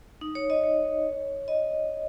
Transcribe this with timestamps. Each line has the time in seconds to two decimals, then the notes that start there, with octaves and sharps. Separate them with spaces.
0.21 D#4
0.35 C#5
0.50 D#5
0.63 C#5
1.48 D#5